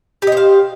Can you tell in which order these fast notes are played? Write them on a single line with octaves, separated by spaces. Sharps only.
G4 D#5 C5 F5